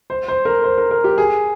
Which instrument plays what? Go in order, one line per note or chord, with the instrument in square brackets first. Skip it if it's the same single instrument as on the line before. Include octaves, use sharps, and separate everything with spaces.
[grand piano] C5
C5
A#4
C5
A#4
A#4
G4
G#4